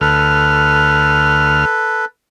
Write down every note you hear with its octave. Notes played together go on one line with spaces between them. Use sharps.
D2 A4 B4 F6